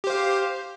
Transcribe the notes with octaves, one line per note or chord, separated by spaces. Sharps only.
G4 C5 F5